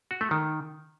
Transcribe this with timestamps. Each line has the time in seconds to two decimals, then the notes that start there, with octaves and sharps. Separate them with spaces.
0.11 F#4
0.21 A3
0.31 D#3